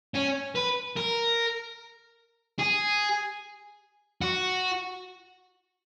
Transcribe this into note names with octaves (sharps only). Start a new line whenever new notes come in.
C#4
B4
A#4
G#4
F#4